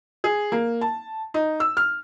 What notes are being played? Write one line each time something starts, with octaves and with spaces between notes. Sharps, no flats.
G#4
A#3
A5
D#4
E6
F6